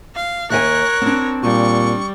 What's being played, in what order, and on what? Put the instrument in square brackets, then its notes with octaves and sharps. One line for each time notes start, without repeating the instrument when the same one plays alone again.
[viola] F5
[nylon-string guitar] D#2 E5 G#5 [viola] A#4 C#5 [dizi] F#6
[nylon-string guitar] C4 D4
[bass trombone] A#2 [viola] G3 [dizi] C#6